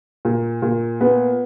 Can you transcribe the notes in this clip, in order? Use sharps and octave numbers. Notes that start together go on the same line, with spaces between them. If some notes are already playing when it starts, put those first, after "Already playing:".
A#2
A#2
B3